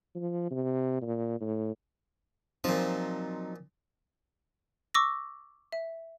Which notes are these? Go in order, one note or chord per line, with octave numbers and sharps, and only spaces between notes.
F3
C3
A#2
A2
A#2 F3 F#3 C4 D#4
C#6 D6 E6 A#6
E5